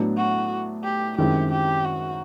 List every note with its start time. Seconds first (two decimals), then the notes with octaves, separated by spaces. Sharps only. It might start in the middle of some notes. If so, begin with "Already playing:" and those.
Already playing: A2 F#3 B3 D4
0.17 F#4
0.84 G4
1.18 F#2 D#3 G#3 C4 E4 G4
1.52 G4
1.85 F#4